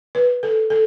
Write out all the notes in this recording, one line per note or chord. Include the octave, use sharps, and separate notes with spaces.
B4
A4
A4